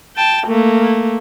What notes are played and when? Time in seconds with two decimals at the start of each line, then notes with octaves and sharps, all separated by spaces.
0.16 G5 A5
0.47 A3 A#3